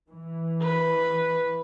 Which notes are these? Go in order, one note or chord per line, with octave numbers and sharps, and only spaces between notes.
E3
B4